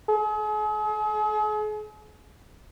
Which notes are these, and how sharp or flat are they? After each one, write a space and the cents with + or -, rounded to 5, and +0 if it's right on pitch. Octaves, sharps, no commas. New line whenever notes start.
G#4 +40